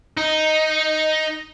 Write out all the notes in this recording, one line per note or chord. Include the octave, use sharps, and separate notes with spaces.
D#4